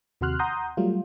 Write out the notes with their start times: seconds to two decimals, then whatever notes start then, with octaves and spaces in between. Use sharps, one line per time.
0.21 D#2 C3 F#4 C6 F6 F#6
0.39 F#5 A#5 C6 D#6 G6
0.77 F#3 G3 A3 F4